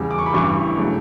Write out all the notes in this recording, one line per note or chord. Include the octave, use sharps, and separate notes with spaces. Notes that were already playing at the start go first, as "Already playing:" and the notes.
Already playing: E2 C#3 G3
D6
C#6
B5
A1 G2 E3 G3 C#6
C#3 F#3 A3